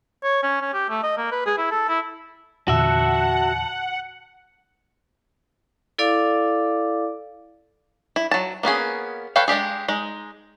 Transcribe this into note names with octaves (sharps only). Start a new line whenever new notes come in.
C#5
C#4
C#4
G4
A3
D#5
A#3
B4
G#4
E4
A4
E4
E2 A#2 D3 F#4 E5 F#5 A5
E4 A4 D5 F5 D6
E4
F#3 A5
A#3 B3 C#4 G#4
A4 B4 C#5 F5 G5
G#3 D4 G4 G#4
G#3 D#4